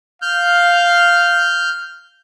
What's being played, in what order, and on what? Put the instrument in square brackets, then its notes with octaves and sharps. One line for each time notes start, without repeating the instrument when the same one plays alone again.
[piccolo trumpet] F5 [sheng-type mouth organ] F6 G6